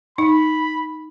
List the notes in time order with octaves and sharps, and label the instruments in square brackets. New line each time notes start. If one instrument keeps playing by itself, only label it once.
[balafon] D#4 [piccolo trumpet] B5